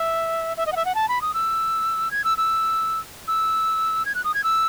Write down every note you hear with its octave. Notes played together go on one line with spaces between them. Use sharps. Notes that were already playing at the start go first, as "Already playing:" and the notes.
Already playing: E5
E5
D#5
F#5
E5
F#5
A5
B5
D#6
E6
G#6
E6
E6
E6
G#6
F#6
D#6
G#6
E6